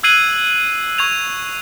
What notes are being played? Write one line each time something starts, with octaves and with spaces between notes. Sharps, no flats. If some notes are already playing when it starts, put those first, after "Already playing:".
E6 F#6 G#6 C7 D#7 F#7
C#6 G#6 F7